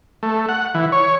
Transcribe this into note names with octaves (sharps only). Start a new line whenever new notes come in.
A3
F#5
E3
C#5